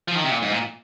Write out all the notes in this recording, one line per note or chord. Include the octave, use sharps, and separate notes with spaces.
F3
D#3
C3
A#2
G#2
A#2